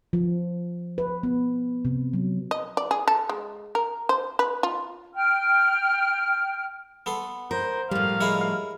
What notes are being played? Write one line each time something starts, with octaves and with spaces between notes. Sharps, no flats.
F3
B4
B3
C3
F#3
D#5
D5
G#4
A4
G#3
A#4
C5
B4
F4
G5 F6
B3 A4 C6
A#4 C5
A2 F3 G3 A#4 F5
G#3 E4 C#5